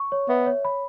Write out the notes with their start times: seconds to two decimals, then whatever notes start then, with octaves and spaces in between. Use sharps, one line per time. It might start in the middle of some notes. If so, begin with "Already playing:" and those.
Already playing: C#6
0.12 C#5
0.29 B3 E5
0.47 C#5
0.65 B5